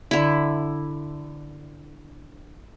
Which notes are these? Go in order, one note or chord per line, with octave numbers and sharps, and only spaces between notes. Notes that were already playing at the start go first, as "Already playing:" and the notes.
D3 E4